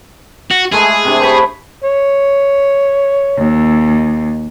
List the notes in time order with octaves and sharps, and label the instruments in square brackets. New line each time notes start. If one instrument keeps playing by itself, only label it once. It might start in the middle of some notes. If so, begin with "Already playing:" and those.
[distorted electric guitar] F#4
[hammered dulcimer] G#3 A3 E4 [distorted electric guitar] G#4
[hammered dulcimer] C3 D4
C5 C#5 B5
[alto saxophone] C#5
[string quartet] D#2